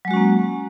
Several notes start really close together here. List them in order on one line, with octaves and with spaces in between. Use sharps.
F#3 G#3 F#4 C#4 A#3